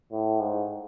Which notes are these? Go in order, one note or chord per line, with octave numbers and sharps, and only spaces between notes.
A2
G#2